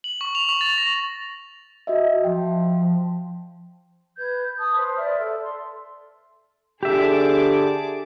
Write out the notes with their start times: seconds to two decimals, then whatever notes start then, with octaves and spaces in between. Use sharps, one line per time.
0.04 F#7
0.21 C#6
0.35 F7
0.49 C#6
0.61 A6
0.78 A#6
1.87 F#4 D#5 E5
2.24 F3 G5
4.17 B4 G6 G#6
4.59 A5 D#6
4.76 B4 C5
4.97 D5 E5 F6
5.18 A4
5.44 C6
6.83 D3 G4 G#4 E5 A5 D6